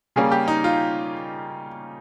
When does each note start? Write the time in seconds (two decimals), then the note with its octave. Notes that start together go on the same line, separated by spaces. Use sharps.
0.16 C#3 G3 A#3 C#4 G#4
0.31 G4
0.48 D#4
0.64 F4